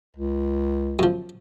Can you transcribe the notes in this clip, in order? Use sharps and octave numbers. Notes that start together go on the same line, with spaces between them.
C#2
F#2 F3